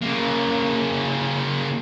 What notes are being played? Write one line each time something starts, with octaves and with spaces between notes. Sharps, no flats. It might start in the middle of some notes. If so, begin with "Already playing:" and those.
C#3 A#3